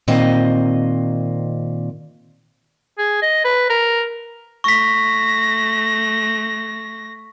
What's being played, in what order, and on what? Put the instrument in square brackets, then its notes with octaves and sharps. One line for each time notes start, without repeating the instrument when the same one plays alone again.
[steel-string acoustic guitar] A#2 D#3 C4 D#5
[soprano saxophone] G#4
D#5
B4
A#4
[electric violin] A3 A#6 [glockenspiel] C#6 B6